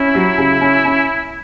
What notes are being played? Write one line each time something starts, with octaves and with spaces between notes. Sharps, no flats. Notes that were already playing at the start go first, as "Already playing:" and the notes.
Already playing: C#4 E4
F#3
C#3
C#4
C#4